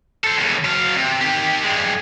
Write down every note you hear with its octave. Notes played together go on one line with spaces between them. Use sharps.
A4 C5
D#2 C#3
F#3 F5
C3
D#3 G4
G2 G#3